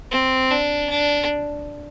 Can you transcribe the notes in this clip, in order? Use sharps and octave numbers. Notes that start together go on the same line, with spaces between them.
C4
D4
D4